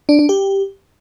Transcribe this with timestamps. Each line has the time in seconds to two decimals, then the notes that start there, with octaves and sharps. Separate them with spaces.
0.09 D4
0.19 D4
0.29 G4